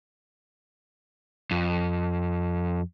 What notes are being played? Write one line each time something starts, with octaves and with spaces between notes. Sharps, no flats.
F2